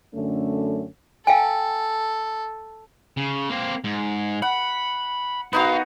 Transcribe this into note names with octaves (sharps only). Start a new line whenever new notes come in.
F#2 D3 A3 C#4 A4
A4 F5 G5 G#5
C#3
A#3 C4
G#2
F#5 B5
B3 D#4 E4 F#4 F5